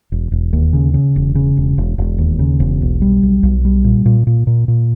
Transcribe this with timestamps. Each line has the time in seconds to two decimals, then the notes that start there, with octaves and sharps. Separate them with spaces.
0.12 E1
0.32 E1
0.53 D#2
0.73 C#3
0.94 C#3
1.16 E1
1.35 C#3
1.57 E1
1.78 E1
1.98 E1
2.18 D#2
2.39 C#3
2.60 E1
2.81 B1
3.02 G3
3.23 B1
3.43 B1
3.65 G3
3.84 A#2
4.06 A#2
4.27 A#2
4.47 A#2
4.68 A#2